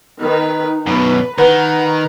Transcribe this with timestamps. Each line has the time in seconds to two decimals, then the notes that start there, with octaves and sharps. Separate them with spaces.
0.20 D#3 D#4 B4
0.86 F#2 B2 B4
1.38 D#3 B4 F#5 A#5